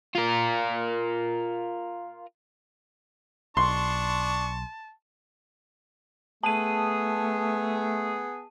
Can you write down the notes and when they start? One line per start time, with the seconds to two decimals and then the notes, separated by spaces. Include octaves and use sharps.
0.15 F4 A#4
3.57 B1 D4 A5 C6 C#6
6.43 A3 B3 G#4 A5 D#7